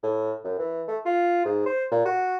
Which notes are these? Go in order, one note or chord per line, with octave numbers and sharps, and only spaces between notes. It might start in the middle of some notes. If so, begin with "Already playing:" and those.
A2
F#2
E3
A3
F4
G#2
C5
A#2
F#4